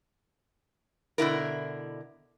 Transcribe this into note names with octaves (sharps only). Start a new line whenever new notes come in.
B2 D3 E4 A#4